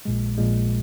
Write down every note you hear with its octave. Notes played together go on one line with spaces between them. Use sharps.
A#1 A#2 G#3
A#1 A#2 G#3